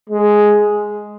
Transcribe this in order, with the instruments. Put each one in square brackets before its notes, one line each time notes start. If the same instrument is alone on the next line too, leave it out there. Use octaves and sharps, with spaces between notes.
[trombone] G#3